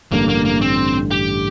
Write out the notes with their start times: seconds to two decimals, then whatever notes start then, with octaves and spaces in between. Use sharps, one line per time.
0.12 A1 G2 D3 A#3
0.29 A#3
0.45 A#3
0.61 C4
1.11 G4